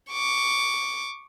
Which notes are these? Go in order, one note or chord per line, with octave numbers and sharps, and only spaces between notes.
C#6 D6